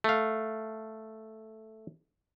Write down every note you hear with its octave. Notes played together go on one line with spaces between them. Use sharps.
A3 F5